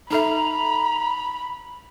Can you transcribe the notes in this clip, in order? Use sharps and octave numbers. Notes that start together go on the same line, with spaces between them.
D#4 A4 E5 A#5 B5